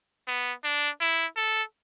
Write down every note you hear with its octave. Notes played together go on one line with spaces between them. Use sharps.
B3
D4
E4
A4